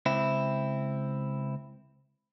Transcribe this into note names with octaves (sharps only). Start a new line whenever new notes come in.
C#2 C4 E4